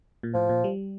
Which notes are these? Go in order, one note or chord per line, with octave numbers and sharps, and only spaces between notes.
A#2
A2 F3
A#2
G3